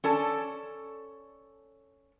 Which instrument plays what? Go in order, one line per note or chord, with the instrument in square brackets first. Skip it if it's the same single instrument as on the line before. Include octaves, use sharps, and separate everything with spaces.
[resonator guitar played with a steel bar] C#4 A4 D5 A5